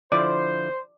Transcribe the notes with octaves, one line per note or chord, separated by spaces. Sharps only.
D3 F3 E4 C5 D5